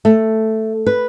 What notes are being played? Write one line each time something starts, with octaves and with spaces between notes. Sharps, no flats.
A3
B4